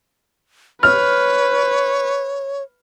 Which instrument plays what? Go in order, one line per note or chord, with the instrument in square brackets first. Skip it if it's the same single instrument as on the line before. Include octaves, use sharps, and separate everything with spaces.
[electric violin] B4 [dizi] C#5 [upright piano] F6